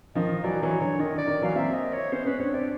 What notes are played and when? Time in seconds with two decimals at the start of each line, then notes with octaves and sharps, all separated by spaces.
0.15 D#3 F3 D#5
0.44 E3 F#3 D5
0.62 E3 F#3 C#5
0.81 D3 C#5
0.99 D#3 D#5
1.14 D3 D5
1.27 D#3
1.42 E3 F#3 F5
1.55 A#3 C4 E5
1.74 D#5
1.93 C#5
2.12 B3 C#4 C5
2.25 B3 C#4 B4
2.40 C4 D4 C#5
2.53 C4 D4 D5